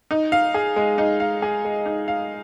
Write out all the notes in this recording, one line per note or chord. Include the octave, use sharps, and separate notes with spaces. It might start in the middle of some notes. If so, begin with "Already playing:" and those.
D#4
F5
G#4
G#3
D#4
F5
G#4
G#3
D#4
F5